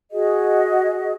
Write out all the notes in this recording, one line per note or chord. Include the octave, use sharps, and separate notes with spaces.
F#4 G#4 D#5